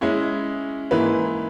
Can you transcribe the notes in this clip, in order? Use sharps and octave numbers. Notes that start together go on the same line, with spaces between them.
G#3 C#4 E4
G#2 E3 A#3 E4 B4